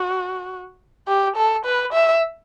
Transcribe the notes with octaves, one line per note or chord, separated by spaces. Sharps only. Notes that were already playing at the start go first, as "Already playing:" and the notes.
Already playing: F#4
G4
A4
B4
E5